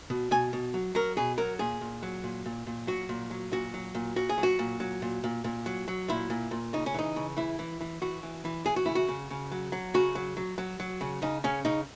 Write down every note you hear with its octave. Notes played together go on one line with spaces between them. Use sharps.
B2
B2 G#5
B2
F#3
F#3 A#4
B2 G#4
F#3 A#4
A#2 G#4
A#2
F#3
A#2
A#2
A#2
F#3 F#4
A#2
F#3
A#2 F#4
F#3
A#2
A#2 F#4
G#4
F#3
F#4
A#2
F#3
A#2
A#2
A#2
F#3
F#3
A#2 E4
A#2
A#2
C#3 D#4
C#4
E3 D#4
C#3
E3 E4
E3
E3
E3 F#4
E3
E3
E3 G#4
F#4
C#3 E4
F#4
C#3
C#3
F#3
F#3
C#3 F#4
F#3
F#3
F#3
F#3
C#3
C#3 D#4
C#3 C#4
C#3 D#4